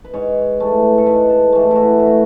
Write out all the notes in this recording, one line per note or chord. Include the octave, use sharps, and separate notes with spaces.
B4
G#2 C#5
E3 A3
A4
G#2 B4
A4
E3 A3
E4 F#4
A2 E4
F#4